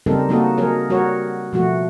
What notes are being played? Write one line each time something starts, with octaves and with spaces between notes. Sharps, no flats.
C#3 G3 C4 D#4 A4 A#4
F#3 A#3 D#4 F#4 A4 D#5
F#3 G#4 A#4 C#5
G3 F#4 A#4 C#5
B2 F3 A3 F#4